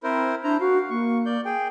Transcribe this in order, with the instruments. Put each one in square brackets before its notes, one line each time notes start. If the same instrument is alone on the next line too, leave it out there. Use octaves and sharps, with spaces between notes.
[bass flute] C4 [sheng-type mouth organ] E4 A#4 C5
[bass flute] D4 [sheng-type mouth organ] E4 C5 A#5
[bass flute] F#4 [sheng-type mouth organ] F5
[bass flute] A#3 [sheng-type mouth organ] C#6
[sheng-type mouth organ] D5 G6
G#4 G5